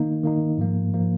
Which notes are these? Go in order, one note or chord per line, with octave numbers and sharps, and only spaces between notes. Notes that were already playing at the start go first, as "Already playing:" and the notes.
Already playing: D#3 A#3 D#4
D#3 A#3 D#4
G#2 F3 A#3
F3 A#3